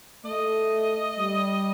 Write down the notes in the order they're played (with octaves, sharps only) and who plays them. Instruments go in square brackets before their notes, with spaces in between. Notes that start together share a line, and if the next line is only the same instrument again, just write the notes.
[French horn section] A3 [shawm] D#5
[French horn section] G3